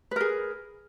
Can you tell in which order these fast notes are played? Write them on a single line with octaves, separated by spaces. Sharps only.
B4 A#4 G#4